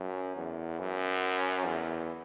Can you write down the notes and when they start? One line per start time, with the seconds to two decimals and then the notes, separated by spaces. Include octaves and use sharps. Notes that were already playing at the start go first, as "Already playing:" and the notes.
Already playing: F#2
0.36 E2
0.80 F#2
1.66 E2